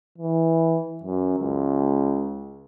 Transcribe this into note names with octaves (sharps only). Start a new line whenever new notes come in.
E3
F#2
C#2